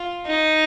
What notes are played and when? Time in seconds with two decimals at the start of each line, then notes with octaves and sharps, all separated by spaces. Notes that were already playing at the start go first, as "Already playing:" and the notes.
Already playing: F4
0.26 D#4